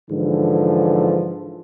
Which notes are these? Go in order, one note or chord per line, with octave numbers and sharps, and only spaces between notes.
G#2 D3 E3 F3